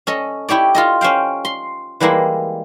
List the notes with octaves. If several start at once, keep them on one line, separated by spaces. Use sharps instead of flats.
C#4 A4 D#5
E4 G4 C#5 D5
F4 A4 D#5
C#4 C5 F5 G5
C6
E3 G3 G#3 A#3 E4